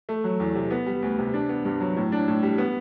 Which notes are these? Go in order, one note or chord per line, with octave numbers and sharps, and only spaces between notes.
A3
F#3
E2
C3
B3
G3
D2
C3
D4
B3
G2
F#3
A2
D4
A2
G3
B3